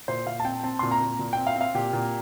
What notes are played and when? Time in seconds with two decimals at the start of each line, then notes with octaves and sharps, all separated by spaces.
0.08 A#2 C5
0.26 A#2 F5
0.40 A5
0.45 C4 G5
0.63 C4 A5
0.79 A#2 C6
0.91 A#5
1.01 A#2
1.19 A#2
1.33 C4 G5
1.47 F5
1.56 C4
1.61 F5
1.74 A#2 G4
1.93 A#2